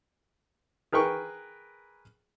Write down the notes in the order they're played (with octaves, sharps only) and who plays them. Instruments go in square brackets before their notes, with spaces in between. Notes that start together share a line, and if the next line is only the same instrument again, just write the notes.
[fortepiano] G#4 A#4 B4 G5 C#6